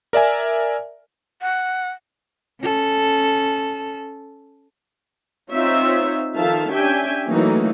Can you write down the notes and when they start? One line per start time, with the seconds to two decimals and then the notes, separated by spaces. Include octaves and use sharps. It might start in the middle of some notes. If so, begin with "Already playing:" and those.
0.13 A#4 D5 E5 G#5
1.41 F#5
2.61 C#4 A4
5.52 C4 D#4 F4 C5 C#5 E5
6.36 D#3 F3 A4 E5 F5 A5
6.70 C#4 D4 G4 E5 G5 G#5
7.28 E3 F#3 A3 A#3 C#4 D#4